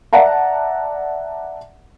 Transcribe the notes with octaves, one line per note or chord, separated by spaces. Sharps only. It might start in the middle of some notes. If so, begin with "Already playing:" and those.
D5 E5 F#5 A5 A#5